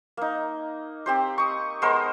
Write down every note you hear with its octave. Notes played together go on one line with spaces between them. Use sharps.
A#3 D#4
C4 G4 C5
C#6 D#6
G#3 B3 A#4 C5